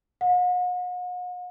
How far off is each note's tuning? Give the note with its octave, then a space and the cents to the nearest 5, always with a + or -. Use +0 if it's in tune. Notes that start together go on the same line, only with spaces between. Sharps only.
F#5 -45